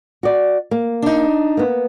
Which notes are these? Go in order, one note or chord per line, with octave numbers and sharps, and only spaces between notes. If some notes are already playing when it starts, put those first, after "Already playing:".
F#4 D5
A#3
D4 D#4
A#3 B3